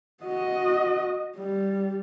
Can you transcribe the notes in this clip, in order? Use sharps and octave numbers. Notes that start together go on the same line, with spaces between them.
F#4 D#5
G3